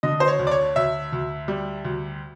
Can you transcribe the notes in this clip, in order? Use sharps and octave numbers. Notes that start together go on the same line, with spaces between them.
D3 D#5
C5
C#5
D2
D5
C#5
D2 E5
D2
G3
D2